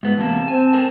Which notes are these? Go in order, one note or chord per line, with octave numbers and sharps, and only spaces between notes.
G#2 B3
E2 C3 A#3 A5
C4 G#5
A2 A#4 G#5